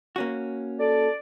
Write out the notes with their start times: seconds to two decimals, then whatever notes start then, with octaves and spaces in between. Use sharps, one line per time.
0.16 A#3 C#4 F#4
0.80 A4 D5